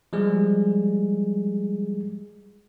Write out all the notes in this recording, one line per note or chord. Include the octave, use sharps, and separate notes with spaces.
F3 G3 G#3 G#4